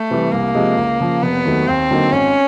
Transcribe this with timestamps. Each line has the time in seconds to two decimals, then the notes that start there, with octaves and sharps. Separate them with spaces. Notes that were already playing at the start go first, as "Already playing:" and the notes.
Already playing: A3
0.10 C3 E3 G3
0.32 C2 A#3
0.55 C3 F3 G#3
0.77 C#2
1.00 C#3 F3
1.23 F1 B3
1.45 D#2 D#3 F#3 A3
1.67 D#2 C4
1.91 D3 F#3 A#3 D#4
2.12 G#1 C#4